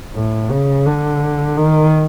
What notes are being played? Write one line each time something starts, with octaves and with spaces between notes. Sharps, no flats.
A2
C#3
D3
D#3